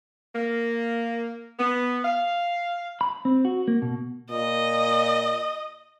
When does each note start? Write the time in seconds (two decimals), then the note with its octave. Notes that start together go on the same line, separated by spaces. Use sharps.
0.35 A#3
1.59 B3
2.04 F5
3.01 B5
3.25 C4
3.45 F#4
3.68 A#3
3.82 B2
4.31 A#2 D#5